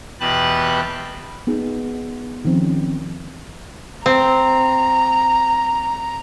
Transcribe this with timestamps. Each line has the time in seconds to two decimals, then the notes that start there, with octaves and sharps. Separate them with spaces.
0.20 E2 B2 G4 B4 A5 F#6
1.47 B3 D#4 G#4
2.45 D#3 F3 C4 C#4
4.06 C4 A#5